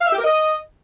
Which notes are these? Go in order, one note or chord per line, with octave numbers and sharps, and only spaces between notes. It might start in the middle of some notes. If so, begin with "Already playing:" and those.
F5
E5
G4
A#4
D#5